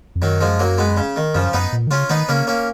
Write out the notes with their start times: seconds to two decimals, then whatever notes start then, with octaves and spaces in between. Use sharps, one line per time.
0.15 F2
0.22 F#2 D#3 F#3
0.41 F3 G#3
0.59 F#3 A#3
0.78 G#3 B3
0.97 C#3
1.16 D#3
1.35 F#2 C#3 F3
1.53 F#2 B3 D#4
1.72 A#2
1.87 D#3
1.91 C#3 C#4 F4
2.09 D#3 B3 D#4
2.29 C#3 A#3 C#4
2.47 A#3 C#4